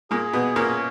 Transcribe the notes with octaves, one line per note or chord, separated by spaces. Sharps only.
A#2 A#3 G#4
B2 B3
A#2 A#3 C#4